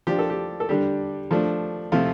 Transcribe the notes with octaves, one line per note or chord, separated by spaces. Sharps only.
F3 D4 G4
A4
G4
A4
D3 G3 D4 G4
F3 A3 D4
C3 F3 A3 F4